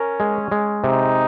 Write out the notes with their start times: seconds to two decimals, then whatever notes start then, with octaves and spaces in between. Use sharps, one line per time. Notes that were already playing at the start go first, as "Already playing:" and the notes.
Already playing: C#4 A#4
0.20 G#3
0.52 G#3
0.83 C3 D#4